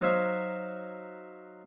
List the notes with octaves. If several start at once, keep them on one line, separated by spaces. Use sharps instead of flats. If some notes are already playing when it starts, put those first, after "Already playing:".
F#3 D#4 C5 C#5 E5 F5